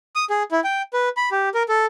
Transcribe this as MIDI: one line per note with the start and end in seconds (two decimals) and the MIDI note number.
0.16 0.25 87
0.30 0.43 68
0.52 0.60 64
0.64 0.82 79
0.93 1.09 71
1.17 1.29 83
1.31 1.49 67
1.54 1.63 70
1.69 1.86 69